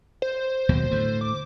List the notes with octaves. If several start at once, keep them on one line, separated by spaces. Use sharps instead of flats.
C5
D#2 B2 F#3
A2 D3 A3
D6